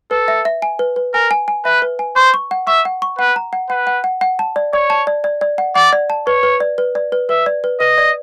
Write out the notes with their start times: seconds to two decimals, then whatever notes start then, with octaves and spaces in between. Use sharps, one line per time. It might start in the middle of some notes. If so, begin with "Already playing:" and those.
0.11 A4 B4
0.28 E5
0.45 E5
0.62 G#5
0.79 B4
0.96 B4
1.14 A#4 G#5
1.31 G#5
1.48 G#5
1.65 B4 E5
1.82 B4
1.99 G#5
2.16 C5 C#6
2.34 C#6
2.51 F#5
2.67 E5 C#6
2.85 F#5
3.02 C#6
3.18 B4 F#5
3.36 A#5
3.53 F#5
3.70 B4 F#5
3.87 F#5
4.04 F#5
4.21 F#5
4.39 A5
4.56 D5
4.73 C#5 D5
4.90 A5
5.07 D5
5.24 D5
5.41 D5
5.58 F#5
5.75 D5 F#5
5.93 D5
6.10 A5
6.27 B4 C#5
6.43 B4
6.60 D5
6.78 B4
6.95 D5
7.12 B4
7.29 B4 E5
7.46 D5
7.64 B4
7.80 B4 D#5
7.98 D5